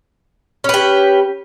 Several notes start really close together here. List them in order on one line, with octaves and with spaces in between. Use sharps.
C#4 B4 G4